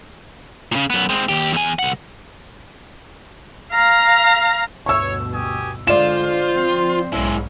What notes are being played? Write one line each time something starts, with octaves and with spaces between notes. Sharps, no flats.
A#2 C#3
F#2 B3
G#3 C4
D#2 G4
E2 G#5
C2 F#5
F5 A#5
D2 G2 B2 C#5 C#6 E6
G4 G#5 D#6
D3 G#3 F4 C5 D5 E7
F3 C4
B1 G#2 G#3 C#4 E4